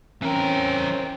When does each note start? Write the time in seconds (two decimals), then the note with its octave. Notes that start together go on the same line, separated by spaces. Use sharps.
0.23 E3 C4 C#4 A#4